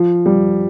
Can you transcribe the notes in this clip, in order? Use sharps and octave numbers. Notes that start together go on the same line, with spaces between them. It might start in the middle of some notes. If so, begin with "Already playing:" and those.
Already playing: F3
G3